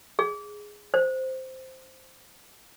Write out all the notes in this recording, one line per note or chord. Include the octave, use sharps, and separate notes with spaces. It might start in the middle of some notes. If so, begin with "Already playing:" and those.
G#4
C5